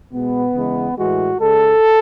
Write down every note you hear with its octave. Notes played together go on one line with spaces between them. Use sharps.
B2 G#3 B3
C#3 E3 G#3
A2 E3 G#3 F#4
C#3 G#3 A4